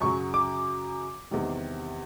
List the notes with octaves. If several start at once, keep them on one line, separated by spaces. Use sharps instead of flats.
F#2 C#3 F#3 C#6
D6
E2 C3 D#3 G3